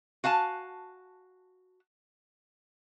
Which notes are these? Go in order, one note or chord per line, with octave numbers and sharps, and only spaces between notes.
F#4 F5 G#5 A5